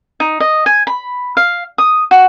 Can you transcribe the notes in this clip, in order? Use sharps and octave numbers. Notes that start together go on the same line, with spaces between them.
D#4
D#5
G#5
B5
F5
D#6
F#4